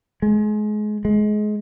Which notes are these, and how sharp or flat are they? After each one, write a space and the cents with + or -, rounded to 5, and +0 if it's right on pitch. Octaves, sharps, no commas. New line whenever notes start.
G#3 +30
G#3 +25